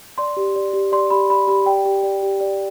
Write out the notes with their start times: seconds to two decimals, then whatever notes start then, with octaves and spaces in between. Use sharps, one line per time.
0.18 D5 C6
0.37 G4
0.56 D5
0.74 G4
0.92 D5 C6
1.10 G4 B5
1.29 D5 B5
1.48 G4 B5
1.66 D5 G5
1.85 G4
2.03 D5
2.23 G4
2.41 D5